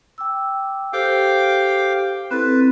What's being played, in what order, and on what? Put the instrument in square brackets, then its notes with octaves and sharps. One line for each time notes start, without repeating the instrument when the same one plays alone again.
[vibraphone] G5 D6 E6
[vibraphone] G4 A4 C5 [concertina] F5 G5 D6
[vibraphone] C4 E4 A4 [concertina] B4